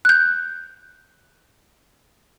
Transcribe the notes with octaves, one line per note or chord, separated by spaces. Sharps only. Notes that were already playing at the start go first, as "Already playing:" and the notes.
F#6 G6